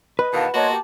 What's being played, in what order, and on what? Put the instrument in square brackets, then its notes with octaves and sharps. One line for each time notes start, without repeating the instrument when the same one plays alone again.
[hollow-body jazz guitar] B4 [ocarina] D#5
[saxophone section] E2 B2 D#3 [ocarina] F5 [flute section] F#5 A5
[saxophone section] A#3 B3 F#4 [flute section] C#5 D#5 C6 [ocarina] A5
[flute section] G4